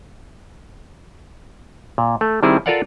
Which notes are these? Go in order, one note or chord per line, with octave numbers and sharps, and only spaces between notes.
A#2
A3
D#3 G3 C4 E4 G#4
F4 A4 A#4 D5 F5 F#5